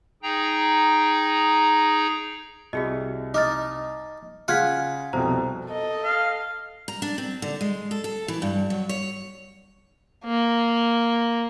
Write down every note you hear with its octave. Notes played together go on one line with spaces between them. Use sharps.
D#4 G#4 G5 A#5
C2 F#4 G#4 D#5
D#4 D6 F6 A6
C#3 F4 F#5 F6 G#6 B6
C2 F2 B2 C5 A#5
A4 D#5
F5
A#5
D4
C4
D3
G#3
A4
A4
E3
G2
F#3
C#5
A#3